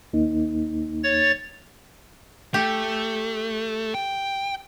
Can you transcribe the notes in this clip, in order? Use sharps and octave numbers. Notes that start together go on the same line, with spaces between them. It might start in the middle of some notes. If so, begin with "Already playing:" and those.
D#2 A#3 D#4
C#5 A6
A3 G4
G5